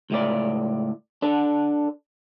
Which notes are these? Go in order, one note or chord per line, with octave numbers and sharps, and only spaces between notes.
C#2 A2 D5
D4 A4